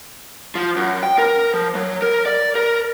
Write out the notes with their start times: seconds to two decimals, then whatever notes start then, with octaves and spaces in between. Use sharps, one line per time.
0.55 F3
0.76 F#2
1.03 G5
1.18 A#4
1.54 F3
1.75 F#3
2.02 A#4
2.26 D5
2.55 A#4